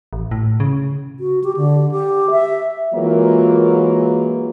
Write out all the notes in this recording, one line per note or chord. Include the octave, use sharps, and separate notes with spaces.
A1
A2
C#3
F#4
G4
D3
G4
E5
E3 F#3 G#3 A#3 F4 A#4